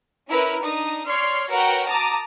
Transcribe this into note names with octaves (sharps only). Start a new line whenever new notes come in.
C#4 E4 A#4 B4
D4 D#4 D#6
C#5 D5 C6 F6 C7
F#4 A#4 B4 C#5 F#5 G5
A5 A#5 D6 D#6